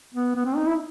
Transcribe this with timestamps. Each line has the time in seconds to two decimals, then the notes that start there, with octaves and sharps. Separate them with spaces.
0.14 B3
0.35 B3
0.46 C4
0.56 D#4
0.66 E4